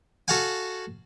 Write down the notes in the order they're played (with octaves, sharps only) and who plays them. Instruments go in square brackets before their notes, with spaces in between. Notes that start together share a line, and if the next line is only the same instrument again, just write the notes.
[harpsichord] F#4 A4 F5 F#5 G#5